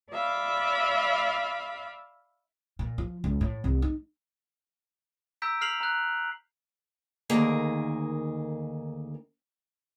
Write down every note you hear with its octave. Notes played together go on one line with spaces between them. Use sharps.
D5 E5 F5 B5
A#2
F3
C#2
A2
C2
D#4
A#5 E6 G6 B6 D7
F6 B6 C7 F7 F#7
A#5 F#6
D2 D#3 A#3 G#4 A#4